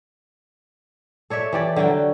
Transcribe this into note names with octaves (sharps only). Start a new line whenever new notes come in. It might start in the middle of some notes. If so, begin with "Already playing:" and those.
A4 C#5 D5 E5
E3 G4 D5
D3 F#3 F#4 G5